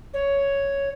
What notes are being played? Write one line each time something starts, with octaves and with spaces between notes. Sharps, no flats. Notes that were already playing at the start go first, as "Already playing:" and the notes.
C#5